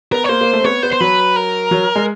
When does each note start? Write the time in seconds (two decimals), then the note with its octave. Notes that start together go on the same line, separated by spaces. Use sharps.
0.12 B3 A#4
0.24 C#5
0.29 A#3 C5
0.41 A#3
0.53 A3
0.60 C4
0.64 B3 C#5
0.83 B3 C5
0.93 C5
1.00 F#3 B4
1.36 A#4
1.71 F#3
1.96 G#3